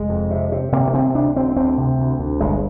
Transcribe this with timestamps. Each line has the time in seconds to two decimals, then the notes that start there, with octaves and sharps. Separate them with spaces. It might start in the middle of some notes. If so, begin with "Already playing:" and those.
Already playing: F1 G#3
0.09 F2
0.31 C3
0.52 C3
0.72 C3 A#3
0.87 A#3
0.94 C3 C4
1.15 D2 D4
1.36 D2 C4
1.56 D2 C4
1.78 C3
1.99 D2
2.19 D2
2.41 G1 G#3